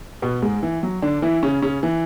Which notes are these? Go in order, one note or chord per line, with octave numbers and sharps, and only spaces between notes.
B2 B3
G#2 G#3
E3
F#3
D3 D4
E3 E4
C#3 C#4
C#3 C#4
E3